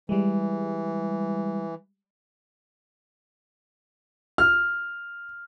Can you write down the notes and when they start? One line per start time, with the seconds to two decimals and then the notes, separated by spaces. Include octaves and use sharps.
0.09 E3 G3 G#3
4.38 F6